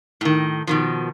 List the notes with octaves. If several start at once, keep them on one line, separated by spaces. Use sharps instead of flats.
A2 D#3
B2 D#3 F3